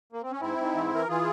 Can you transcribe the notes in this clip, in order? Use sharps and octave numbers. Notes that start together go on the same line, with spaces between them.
A#3
C4
C#4
G#2 C4 E4
G#2
E3
E3 A#4
E3 F4 G#4